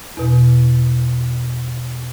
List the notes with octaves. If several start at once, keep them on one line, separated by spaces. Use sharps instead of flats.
E2 B2